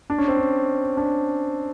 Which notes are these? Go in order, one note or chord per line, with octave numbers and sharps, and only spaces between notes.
D4
C#4
C4
C#4
D4